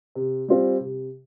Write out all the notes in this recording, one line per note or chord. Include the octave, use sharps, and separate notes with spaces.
C3
G3 C4 F4
C3